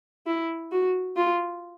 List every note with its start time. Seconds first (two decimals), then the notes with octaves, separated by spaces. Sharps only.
0.26 E4
0.71 F#4
1.16 F4